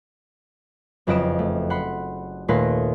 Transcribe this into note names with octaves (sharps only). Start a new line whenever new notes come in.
F#1 F2 B4 D#5 D7 E7
A3
F#5 B5 C6
D#2 A#2 A3 B4 C6 A#6